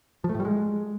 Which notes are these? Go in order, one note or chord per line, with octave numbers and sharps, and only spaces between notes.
F3
A3
A2
G3
G#3